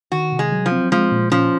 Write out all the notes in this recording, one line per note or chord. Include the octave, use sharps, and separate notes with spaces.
D#3 F#4
C3
G#3
F#3
F3
C4
F3 G#3
A#2
F3 C#4